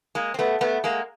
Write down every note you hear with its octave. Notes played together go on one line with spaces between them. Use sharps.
G#3 A#3
C4
A3 B3
A3 B3
G#3 A#3